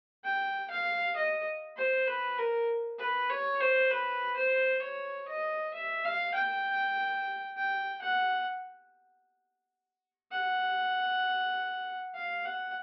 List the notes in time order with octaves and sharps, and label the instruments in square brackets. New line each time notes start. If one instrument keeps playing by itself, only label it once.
[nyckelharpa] G5
F5
D#5
C5
B4
A#4
B4
C#5
C5
B4
C5
C#5
D#5
E5
F5
G5
G5
F#5
F#5
F5
F#5